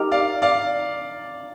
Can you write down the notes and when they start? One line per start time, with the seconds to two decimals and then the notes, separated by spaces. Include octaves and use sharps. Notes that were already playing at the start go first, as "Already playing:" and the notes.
Already playing: D#4 G4 A#4
0.11 D5 F5
0.42 D5 F5